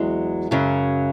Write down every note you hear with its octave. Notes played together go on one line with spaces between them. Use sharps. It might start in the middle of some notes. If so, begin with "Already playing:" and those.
Already playing: E2 F#3 G#3
F#2 C#3 F#3